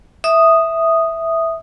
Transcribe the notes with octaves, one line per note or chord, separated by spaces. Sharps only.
E5 D#6